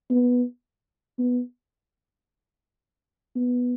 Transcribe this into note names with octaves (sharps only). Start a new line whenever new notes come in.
B3
B3
B3